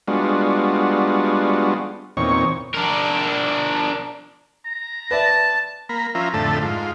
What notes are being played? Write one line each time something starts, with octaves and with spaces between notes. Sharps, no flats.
G3 G#3 B3 D4 F4 F#4
E2 A#2 C4 D#4 C#5 C#6
D4 A#4
A#5
B4 D5 E5 A5
A#3 A#5 B5
F3 C#4 F4 E5 A#5
F2 A2 D3 A3 A5
G#2 F4